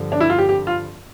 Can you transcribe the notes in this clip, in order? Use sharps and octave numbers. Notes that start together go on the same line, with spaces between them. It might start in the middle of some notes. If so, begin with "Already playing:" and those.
Already playing: G2 D3 F3
D4
E4
F4
G4
G4
F4